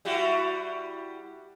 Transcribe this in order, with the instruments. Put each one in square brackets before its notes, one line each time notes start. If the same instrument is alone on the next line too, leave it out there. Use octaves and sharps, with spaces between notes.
[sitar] G3 E4 F#4